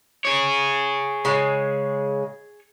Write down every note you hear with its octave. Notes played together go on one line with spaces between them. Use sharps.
G#4 C#5
C#3 G#3